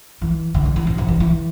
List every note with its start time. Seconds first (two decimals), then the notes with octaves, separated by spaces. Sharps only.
0.22 E3
0.54 D3
0.66 C3
0.76 E3
0.87 C3
0.98 C3
1.08 E3
1.20 E3